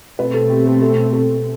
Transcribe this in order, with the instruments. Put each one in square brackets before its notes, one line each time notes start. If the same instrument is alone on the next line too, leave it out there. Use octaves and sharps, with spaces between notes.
[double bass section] B2 A3 C4 [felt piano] B4
[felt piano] A4
G4
A4
A4
A4